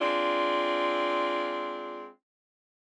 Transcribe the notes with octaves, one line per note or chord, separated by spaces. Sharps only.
G#3 C4 D4 F4